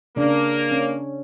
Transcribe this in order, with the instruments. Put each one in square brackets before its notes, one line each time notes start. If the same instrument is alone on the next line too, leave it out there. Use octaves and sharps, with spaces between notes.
[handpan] C#3 D4 [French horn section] A#3
[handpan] C#4